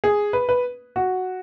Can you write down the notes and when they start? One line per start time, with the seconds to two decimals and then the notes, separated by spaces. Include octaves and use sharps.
0.04 G#4
0.33 B4
0.49 B4
0.96 F#4